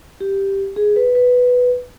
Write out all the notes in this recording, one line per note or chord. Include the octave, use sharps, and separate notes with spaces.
G4
G#4
B4
B4